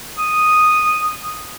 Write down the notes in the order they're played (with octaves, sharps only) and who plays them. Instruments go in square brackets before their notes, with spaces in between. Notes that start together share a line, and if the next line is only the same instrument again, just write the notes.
[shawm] D#6